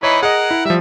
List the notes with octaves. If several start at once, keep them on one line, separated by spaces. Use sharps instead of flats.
E3 D#4 C#5 B5
G#4 A#4 D#5 F#5
E4
F3 G3 E5